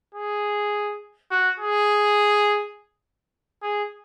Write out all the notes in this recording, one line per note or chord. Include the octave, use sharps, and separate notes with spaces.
G#4
F#4
G#4
G#4